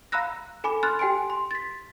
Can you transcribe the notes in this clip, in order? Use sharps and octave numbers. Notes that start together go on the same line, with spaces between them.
F5 A#5 B5 E6 F#6 A#6
A4 G#5 B5 D6
B5 C6 F6 F#6 A6
G4 G5 G#5 C6 D7
C6
A6 B6